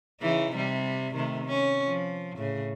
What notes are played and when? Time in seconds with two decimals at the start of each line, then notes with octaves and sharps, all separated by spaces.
0.21 C#3 E3 D#4
0.53 C3 G3
1.15 C3 D#3 A3
1.46 C#4
1.87 F3
2.36 A2 C#3